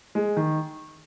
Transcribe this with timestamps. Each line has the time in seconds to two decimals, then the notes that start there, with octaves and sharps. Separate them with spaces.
0.15 G#3
0.37 D#3